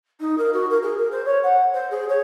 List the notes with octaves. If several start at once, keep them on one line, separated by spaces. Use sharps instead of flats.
D#4
A#4
F#4
A#4
G#4
A#4
C5
C#5
F#5
C5
G#4
C#5